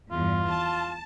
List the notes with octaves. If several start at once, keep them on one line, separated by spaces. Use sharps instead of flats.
E2 G2 F4
A5